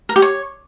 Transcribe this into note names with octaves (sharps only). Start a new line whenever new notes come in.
A#4
G4
C#5